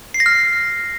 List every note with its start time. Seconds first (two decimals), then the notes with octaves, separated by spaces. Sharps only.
0.14 C7
0.20 A#6
0.26 F6